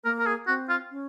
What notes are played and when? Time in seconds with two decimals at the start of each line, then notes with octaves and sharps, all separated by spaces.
0.04 A#3 A#4
0.19 A#4
0.26 G#4
0.47 C4 F#4
0.69 F4
0.91 C#4